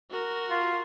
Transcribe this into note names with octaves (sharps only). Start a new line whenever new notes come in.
F#4 A#4
F4